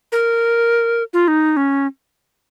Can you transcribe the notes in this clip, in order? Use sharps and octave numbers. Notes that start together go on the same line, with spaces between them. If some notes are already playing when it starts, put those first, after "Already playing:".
A#4
F4
D#4
C#4